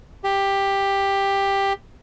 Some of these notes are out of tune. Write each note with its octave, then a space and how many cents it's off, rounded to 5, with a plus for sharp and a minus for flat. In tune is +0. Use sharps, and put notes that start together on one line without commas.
G4 +10